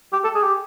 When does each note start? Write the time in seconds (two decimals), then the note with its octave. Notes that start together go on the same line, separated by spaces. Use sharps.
0.13 G4
0.24 A4
0.35 G#4
0.43 G4